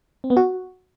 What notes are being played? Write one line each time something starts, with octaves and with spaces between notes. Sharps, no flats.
C4
B3
F#4